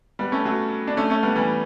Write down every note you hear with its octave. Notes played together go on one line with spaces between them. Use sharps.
G3 B3
A3 C#4
F#3 A3
D4
A3 C#4
A3 C#4
G3 B3
E3 G3